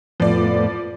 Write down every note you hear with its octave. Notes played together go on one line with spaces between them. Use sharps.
F2 A2 F3 B3 D5